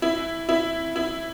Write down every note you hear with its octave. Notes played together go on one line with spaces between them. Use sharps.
E4
E4
E4